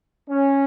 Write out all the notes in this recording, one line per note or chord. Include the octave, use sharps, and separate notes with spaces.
C#4